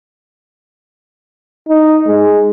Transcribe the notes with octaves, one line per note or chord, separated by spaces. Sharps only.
D#4
G#3